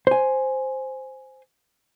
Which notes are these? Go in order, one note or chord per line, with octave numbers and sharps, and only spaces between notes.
C5 G#5